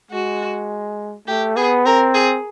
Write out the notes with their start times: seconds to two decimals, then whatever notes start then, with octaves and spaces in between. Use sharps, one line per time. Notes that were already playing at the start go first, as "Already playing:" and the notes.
0.11 G#3 F#4
1.28 A3 G4
1.56 B3 G#4
1.86 C4 A#4
2.14 G#4